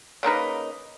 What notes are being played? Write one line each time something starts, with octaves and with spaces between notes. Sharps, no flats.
C#3 A#3 D#4 B4